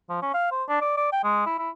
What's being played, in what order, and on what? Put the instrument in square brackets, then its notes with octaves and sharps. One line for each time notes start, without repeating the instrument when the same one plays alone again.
[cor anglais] F3
C#4
F5
C5
D4
D5
D5
G5
G#3
E4
E4